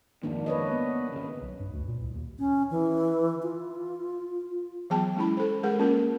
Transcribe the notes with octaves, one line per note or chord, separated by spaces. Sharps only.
F2 G#2 D#3 A#3 D4
B4 C#5 D#5
B3
G#1 C#3
B1
G2
D2
A#2
C2
D#2
C#4
E3
F4
E3 F#3 B3 G#4 G5 A5
G#3 C#4 E4 B5
A4 C5
G#3 G#4 A#4 F#5
A#3 C#4 F4 A#4